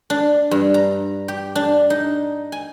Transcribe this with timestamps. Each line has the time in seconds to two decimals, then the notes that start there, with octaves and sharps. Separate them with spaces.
0.10 D4
0.51 G2
0.74 A#5
1.28 G4
1.55 D4
1.90 D#4
2.52 G#5